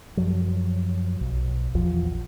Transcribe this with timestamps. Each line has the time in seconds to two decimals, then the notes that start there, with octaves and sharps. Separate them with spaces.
0.17 F#2 F3 F#3
1.21 B1
1.74 A#1 E2 F3